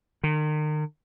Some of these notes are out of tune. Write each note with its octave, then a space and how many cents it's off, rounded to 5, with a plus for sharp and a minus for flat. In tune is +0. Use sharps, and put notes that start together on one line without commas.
D#3 -35